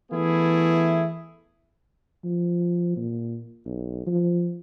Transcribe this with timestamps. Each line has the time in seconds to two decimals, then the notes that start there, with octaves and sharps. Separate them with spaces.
0.12 E3 A3 B3 E4 G#4
2.24 F3
2.97 A#2
3.66 B1
4.06 F3